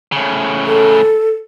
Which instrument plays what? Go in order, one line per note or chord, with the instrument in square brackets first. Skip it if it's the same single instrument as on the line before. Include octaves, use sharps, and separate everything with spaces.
[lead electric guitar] A2 C#3
[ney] A4